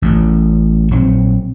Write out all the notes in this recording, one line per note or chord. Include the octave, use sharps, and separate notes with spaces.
A1 A2 C#3
A#1 F#3 C4